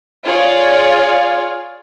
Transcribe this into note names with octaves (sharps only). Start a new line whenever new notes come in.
F4 G#4 C#5 D5 F5